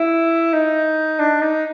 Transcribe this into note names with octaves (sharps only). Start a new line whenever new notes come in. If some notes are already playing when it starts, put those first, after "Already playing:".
Already playing: E4
D#4
D4
D#4